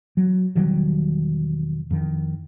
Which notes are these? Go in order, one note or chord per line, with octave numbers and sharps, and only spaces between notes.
F#3
E1 D#3 F#3 G3
F2 D#3